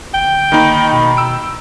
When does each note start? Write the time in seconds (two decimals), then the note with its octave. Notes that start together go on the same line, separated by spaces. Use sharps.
0.14 G1 G5
0.52 D#3 A#3 D#4 B5
0.92 B2
1.17 E6 D7